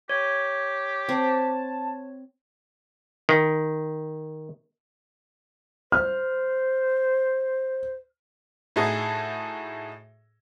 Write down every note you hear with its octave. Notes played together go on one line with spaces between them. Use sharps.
G4 C#5
C4 A5
D#3
C5 F6
A2 A3 D#4 F#4 G#4 A4